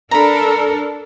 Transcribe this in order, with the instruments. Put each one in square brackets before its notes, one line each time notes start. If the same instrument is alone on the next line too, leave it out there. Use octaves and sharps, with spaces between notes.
[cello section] D4 A4 A#4 [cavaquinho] A#5 B5